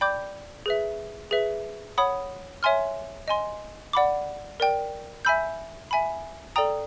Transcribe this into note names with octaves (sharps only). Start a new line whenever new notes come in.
D5 G5 B5 D6 G6
G#4 B4 E5
G#4 B4 E5
C#5 F#5 B5 D#6
C#5 E5 G#5 C6 F6
D#5 G#5 C6
D5 F#5 B5 D6
A#4 D5 G5
E5 G#5 B5 E6 G6
E5 G#5 B5
A4 D5 G5 A#5 D#6